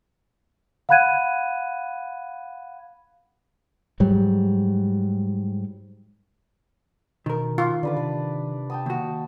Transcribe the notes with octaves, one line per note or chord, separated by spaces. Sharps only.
F5 F#5 B5 F#6 G#6 D#7
G#2 F#3 G3
B2 D#3 A#4
F4
D3 D4 B4 D6
C3 D5
G5 A5 D#6
D#2 F#4